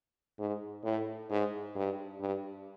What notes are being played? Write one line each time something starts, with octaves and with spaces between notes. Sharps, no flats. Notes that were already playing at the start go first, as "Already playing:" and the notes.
G#2
A2
G#2
G2
G2